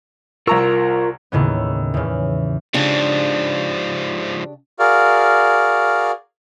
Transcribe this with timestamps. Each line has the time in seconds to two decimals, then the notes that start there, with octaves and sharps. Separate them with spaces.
0.47 C2 F4 A#4 A#5 C#6 E6
1.32 D#2 A2 C#3 B3
1.94 E2 C#3
2.74 G#2 C#3 F3 D4 G4
4.79 F#4 G#4 A#4 D5 F5